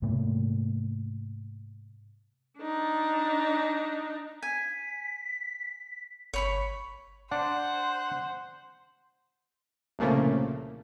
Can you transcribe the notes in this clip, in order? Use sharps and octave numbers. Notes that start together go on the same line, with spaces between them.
G#2 C3 A3 A#3
D4 D#4
G#5 B6
G1 C#5 B5 C#6
D4 C5 F#5
C2 A#2 C#3 F3 A3 A#3